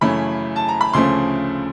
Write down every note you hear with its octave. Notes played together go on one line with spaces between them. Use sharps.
F#2 C#3 E3 A3 C#4 B5
A5
A#5
B5
D2 C#3 F3 A3 C#4 C6